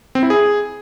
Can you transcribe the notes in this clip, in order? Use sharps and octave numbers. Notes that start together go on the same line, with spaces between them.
C4
E4
G#4